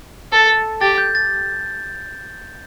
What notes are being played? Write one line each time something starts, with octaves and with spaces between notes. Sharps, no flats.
A4
G4 A6
G6
A6